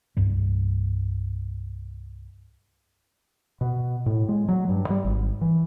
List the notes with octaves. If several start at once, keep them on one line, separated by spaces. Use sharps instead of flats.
C2 G2 G3
B2
A2
G#3
F#3
G2
G3
G#1
E3